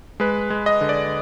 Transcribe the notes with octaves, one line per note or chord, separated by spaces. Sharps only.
G#3 B4
G#3
D#5
D3
D5